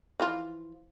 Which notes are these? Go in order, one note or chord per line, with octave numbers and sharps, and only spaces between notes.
E3 F3 F4